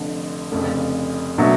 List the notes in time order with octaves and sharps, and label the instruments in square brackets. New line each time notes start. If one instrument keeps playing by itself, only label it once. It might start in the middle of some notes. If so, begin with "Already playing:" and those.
Already playing: [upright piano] F1 F2 D3
F1 F2 C#3
B2 F#3 A3 D4